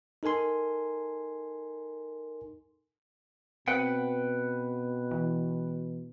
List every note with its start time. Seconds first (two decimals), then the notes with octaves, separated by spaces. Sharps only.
0.23 D#4 A4 A#4 G#5 C6
3.68 B2 C4 B4 F#5 G5
5.11 E3